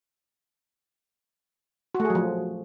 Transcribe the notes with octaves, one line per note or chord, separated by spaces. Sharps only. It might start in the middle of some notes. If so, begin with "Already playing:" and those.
F#4
A3
G#4
F#3
F3